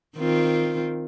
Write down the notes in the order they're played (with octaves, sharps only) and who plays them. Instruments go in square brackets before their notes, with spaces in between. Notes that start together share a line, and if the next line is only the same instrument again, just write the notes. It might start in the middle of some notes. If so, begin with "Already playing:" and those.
[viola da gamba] D#3 C4 F4